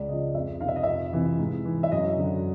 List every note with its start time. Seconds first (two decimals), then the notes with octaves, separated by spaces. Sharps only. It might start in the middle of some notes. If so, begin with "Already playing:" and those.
Already playing: C#2 D5
0.08 C#3 F3 D#5
0.34 F2 E5
0.61 D#3 F5
0.65 C3 E5
0.76 D#5
0.83 F2 E5
1.13 C3 E3
1.38 G#2
1.65 E3
1.83 E5
1.92 F#2 D#5
2.17 D3 F#3